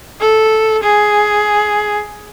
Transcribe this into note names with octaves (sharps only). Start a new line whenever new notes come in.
A4
G#4